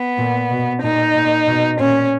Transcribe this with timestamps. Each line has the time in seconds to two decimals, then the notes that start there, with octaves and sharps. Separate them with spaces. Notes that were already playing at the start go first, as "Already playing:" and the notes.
Already playing: B3
0.18 A#2
0.50 B2
0.82 A#2 D#4
1.15 A#2
1.46 B2
1.79 A#2 C#4